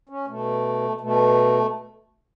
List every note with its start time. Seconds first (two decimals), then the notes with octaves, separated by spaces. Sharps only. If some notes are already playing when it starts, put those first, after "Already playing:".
0.09 C#4
0.28 B2 A3
1.01 B2 A3